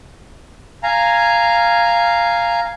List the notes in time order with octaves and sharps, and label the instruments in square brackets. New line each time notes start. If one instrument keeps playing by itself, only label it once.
[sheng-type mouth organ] F5 G#5 A#5